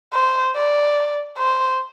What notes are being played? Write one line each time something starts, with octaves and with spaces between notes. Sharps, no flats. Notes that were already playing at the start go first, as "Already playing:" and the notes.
C5
D5
C5